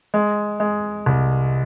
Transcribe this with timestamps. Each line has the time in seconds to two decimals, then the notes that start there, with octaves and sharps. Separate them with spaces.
0.14 G#3
0.60 G#3
1.06 C2